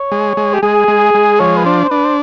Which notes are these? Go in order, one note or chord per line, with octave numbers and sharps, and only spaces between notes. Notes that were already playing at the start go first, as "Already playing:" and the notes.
Already playing: C#5
G#3
G#3
G4
G#3 G#4
G#3
G#3
F3 C#5
B4
D4 C5
C5
D4 B4
C5